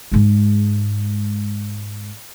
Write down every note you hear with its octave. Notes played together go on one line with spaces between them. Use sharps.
G#2 G#3